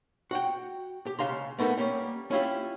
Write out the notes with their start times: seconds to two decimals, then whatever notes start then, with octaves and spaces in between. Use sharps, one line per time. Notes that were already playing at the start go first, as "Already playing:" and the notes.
0.31 F#4 F#5 G5
1.06 G4
1.19 C#2 C#3 F5 A#5 C6
1.58 A3 B3 D#4 A4 A#4
1.77 G3 A#3 C#4
2.31 C#4 E4 F4 G4